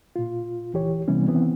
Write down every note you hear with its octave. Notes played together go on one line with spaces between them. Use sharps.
A#2 F4
C#2 E3 G4 C#5
C3 E3 G3 B3 C#4
D#3 E3 B3 C4